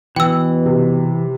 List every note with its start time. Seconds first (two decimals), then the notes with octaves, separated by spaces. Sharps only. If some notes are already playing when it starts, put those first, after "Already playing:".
0.16 B2 E3 G5 E6
0.66 C3